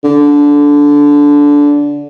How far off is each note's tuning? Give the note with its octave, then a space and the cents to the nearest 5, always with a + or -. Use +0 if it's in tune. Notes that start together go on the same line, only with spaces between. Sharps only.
D3 -15